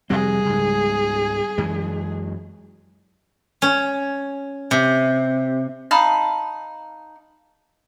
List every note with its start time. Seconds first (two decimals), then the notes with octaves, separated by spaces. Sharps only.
0.10 F2 C3 G3 C4 G#4
0.45 C#2 G#2
1.58 F#2 E3 G#3
3.62 C#4
4.71 C3
5.91 D#4 F5 A5 B5